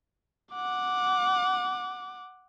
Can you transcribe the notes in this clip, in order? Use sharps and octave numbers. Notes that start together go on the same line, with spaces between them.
F#5 D6